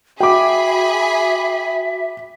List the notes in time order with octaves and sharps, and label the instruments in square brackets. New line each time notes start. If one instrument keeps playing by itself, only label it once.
[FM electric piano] F#4 [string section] G#4 G#5 B5 [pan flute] E5 [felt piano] G5 D6